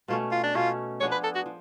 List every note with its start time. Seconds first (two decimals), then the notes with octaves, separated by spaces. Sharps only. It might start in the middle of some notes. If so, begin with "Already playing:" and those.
0.08 B2 A3 C#4 F4
0.32 F4
0.44 D4
0.55 B2 A3 C#4 F4
1.00 F3 B3 D4 G#4 C#5
1.12 B4
1.24 A4
1.35 F#4
1.46 F3